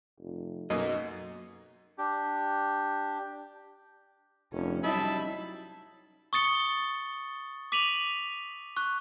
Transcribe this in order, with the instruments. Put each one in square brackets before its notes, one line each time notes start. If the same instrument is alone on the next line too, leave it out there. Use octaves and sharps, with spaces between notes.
[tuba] F1
[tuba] B1 [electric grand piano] F#2 F#3 A#3 [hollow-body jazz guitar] D#5
[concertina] D4 G4
[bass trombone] F1 [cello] C#4
[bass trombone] F#3 [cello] G3 C#4 [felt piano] D#4 E4 [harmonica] E5 A5 B5
[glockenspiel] C#6 D#6 A6 C#7 G7
D6 B6 D#7 F7 F#7
C#6 F#6